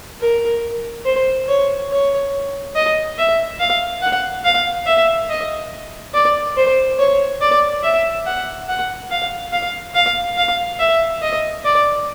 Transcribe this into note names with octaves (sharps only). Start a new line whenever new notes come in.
A#4
C5
C#5
C#5
D#5
E5
F5
F#5
F5
E5
D#5
D5
C5
C#5
D5
E5
F#5
F#5
F5
F5
F5
F5
E5
D#5
D5